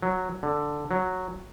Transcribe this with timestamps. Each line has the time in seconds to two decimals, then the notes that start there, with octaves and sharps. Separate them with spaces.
0.02 F#3
0.43 D3
0.91 F#3